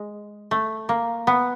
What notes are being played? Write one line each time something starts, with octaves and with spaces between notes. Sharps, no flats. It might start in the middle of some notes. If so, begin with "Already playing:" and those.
Already playing: G#3
A3
A#3
B3